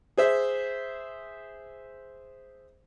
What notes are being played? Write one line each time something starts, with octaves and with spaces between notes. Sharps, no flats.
G#4 C5 E5